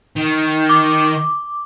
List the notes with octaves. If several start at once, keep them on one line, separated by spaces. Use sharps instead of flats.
D#3
D6